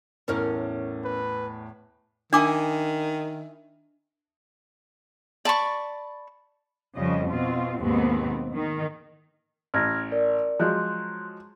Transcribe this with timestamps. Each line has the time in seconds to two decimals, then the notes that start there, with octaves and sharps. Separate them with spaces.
0.28 E2 A2 A3 C#4 A#4 C#5
1.04 B4
2.33 D#3 D4 E4 G#5 D6 D#6
5.45 D5 A5 B5 C#6
6.96 F2 C#3 F3 G3 D#5
7.29 B2 C4 F4
7.80 D#2 G#2 B2 D#3 B3 C4
8.53 D#3
9.74 A1 F6 G#6 A#6
10.12 A#4 D5
10.59 F3 F#3 G#3 C6 F#6 G6